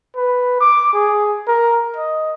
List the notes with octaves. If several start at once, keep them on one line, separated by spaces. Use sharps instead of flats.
B4
D6
G#4
A#4
D#5